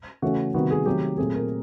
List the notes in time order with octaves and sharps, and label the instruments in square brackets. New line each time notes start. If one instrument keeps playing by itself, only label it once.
[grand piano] C#3 E3 A3 C#4 F#4
C3 D#3 G3 B3 F#4
G#4
C3 D#3 F#3 A3 G4
A#2 F#3 A3 C4 G#4
A#4